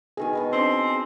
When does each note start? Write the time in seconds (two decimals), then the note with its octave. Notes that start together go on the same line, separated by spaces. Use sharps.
0.17 B2 D#3 G#4 G#5
0.33 B2 B4 D#5
0.53 C4 D4 D#5 C6